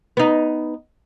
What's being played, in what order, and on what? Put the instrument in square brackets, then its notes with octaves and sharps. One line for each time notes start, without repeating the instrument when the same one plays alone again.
[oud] B3 D#4